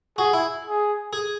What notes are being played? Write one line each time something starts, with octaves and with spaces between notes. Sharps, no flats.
F#4 G#4
E4
G#4
G#4